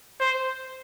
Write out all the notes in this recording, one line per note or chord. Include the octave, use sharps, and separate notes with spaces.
C5